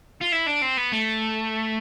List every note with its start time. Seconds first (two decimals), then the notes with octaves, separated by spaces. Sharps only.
0.21 F4
0.33 E4
0.47 D4
0.62 C4
0.77 B3
0.93 A3